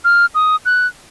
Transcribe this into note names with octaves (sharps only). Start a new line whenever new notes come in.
F6
D#6
F#6